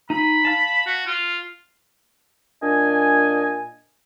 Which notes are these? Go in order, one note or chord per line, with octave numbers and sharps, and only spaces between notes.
D#4 B5
F5 A5
F#4
F4
A#2 D4 D#5 G#5